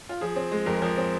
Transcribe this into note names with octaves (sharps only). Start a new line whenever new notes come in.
F4
F3 G#4
C4
G#3
F2 A#4
G#4
F3 A#4
C4